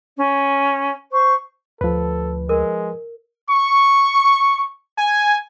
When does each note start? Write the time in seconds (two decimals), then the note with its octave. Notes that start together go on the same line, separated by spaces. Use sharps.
0.17 C#4
1.12 C5 C#6
1.81 D2 F3 A4 B4
2.49 G#3 A#4
3.51 C#6
4.98 G#5